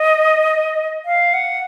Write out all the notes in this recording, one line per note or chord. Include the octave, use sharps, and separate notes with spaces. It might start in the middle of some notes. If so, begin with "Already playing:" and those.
Already playing: D#5
F5
F#5